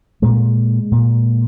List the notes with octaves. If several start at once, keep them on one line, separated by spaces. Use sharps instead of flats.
A#2 G#3
A#2